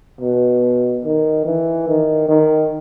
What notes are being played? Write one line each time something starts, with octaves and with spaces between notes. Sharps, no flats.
B2
D#3
E3
D#3
D#3